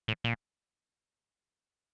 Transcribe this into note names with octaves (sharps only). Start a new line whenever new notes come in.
A2
A#2